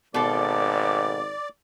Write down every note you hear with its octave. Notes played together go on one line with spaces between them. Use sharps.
G#1 B2 A4 D5 D6